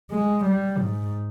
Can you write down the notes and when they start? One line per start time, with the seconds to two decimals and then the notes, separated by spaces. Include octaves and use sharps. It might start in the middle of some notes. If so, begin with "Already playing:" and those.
0.11 G#3
0.45 G3
0.78 G#2